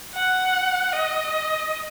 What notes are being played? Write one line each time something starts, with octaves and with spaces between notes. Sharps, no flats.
F#5
D#5